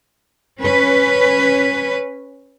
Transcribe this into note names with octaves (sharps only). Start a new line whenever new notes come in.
C#4 B4